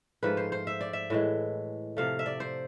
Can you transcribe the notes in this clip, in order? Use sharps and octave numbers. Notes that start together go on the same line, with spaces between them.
G#2 F3 A3 B4
C5
C5
E5
D5
E5
A2 E3 G#3
C3 F3 A3 F5
E5
D5
C5